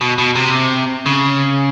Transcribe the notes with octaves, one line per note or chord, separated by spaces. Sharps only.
B2
B2
C3
C#3